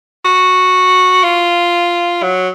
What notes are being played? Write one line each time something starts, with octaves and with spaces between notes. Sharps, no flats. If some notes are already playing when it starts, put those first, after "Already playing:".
F#4
F4
F#3